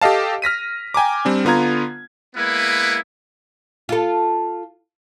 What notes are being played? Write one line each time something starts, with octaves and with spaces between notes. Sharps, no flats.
G4 A4 D#5 F5 A5
F6 A#6 B6 D#7
G5 G#5 A#5 D6
G3 C4 D4
D3 B3 F4 A#5 G#6
G#3 A#3 B3 E4 B4
F4 A4